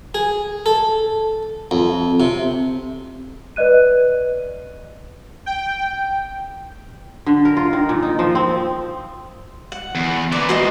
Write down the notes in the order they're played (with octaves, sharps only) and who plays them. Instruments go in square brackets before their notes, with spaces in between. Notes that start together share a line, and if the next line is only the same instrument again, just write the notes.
[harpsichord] G#4
A4
F2
C3
[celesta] B4 D5 D#5 F#6 D#7
[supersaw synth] G5
[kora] D3
A#4
F4
D#3
A#2
D#4
F3
C4
[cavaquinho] F#5
[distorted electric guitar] E2
[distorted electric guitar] A#2 E3 [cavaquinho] D5
[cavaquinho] F#4 C5 D#5